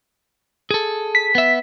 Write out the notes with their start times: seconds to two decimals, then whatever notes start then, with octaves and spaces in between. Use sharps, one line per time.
0.71 G#4 A4
1.15 B6
1.35 B3 E5